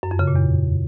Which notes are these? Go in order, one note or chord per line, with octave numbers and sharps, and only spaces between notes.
F#2
F2
C#3
A#2
E2